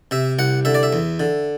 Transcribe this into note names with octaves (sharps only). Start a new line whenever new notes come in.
C3 E5
C2 F#5
D3 E5
D5
E5
E2
D3